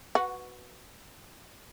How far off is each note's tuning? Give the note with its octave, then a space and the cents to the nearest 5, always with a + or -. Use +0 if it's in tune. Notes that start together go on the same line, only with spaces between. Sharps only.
F#4 +0 B4 +0 F#5 -20